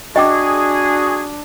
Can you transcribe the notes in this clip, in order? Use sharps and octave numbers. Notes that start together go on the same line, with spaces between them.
D4 F#4 G#4 D#5 G5 D6